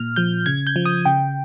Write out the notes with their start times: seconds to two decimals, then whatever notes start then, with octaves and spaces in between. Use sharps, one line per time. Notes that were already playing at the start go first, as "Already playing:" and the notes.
Already playing: A#2 F6
0.16 F3 G6
0.46 C#3 G#6
0.67 G6
0.76 F3
0.85 D#6
1.05 C#3 G5